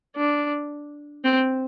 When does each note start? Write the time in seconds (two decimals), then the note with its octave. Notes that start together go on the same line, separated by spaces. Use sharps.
0.16 D4
1.24 C4